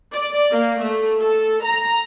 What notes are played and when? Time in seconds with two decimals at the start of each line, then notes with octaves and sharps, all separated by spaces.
0.13 D5
0.51 A#3
0.82 A3
1.20 A4
1.64 A#5